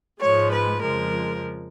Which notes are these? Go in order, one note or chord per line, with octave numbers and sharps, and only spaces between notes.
G#2 F3 G#3 C#5
B4
F2 C#3 F3 G#3 A#4